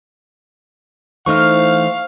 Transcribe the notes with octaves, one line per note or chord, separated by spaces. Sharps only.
E3 A3 D#4 C5 F5 C#6 F6